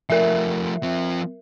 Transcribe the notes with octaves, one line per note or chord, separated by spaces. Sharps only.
F3 A3 A#4 E5
F3 C4